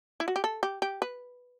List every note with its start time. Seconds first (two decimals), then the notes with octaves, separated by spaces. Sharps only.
0.20 E4
0.28 F#4
0.36 G4
0.44 A4
0.63 G4
0.82 G4
1.02 B4